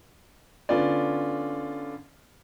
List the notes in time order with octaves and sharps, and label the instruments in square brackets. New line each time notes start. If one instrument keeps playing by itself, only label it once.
[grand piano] D3 B3 C#4 F4 D5